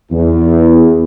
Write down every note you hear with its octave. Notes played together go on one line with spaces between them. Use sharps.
E2